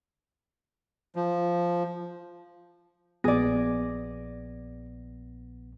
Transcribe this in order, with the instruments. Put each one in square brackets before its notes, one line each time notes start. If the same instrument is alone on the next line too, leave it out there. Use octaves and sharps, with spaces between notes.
[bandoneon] F3
[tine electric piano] A#1 A#6 [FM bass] B3 [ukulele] G#4 D5